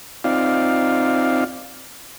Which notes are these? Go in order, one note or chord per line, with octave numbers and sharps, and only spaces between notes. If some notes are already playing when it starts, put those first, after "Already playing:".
C4 D#4 F4 D5 F5